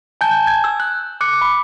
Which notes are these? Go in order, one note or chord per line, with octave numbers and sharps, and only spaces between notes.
G#5 A5 G6
G#6
E6
F#6
D6 F#6 C#7
B5